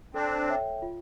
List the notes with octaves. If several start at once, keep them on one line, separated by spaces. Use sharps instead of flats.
C4 D4 A4
C#5 E5 G5
F4